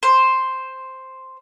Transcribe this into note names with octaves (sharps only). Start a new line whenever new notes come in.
C5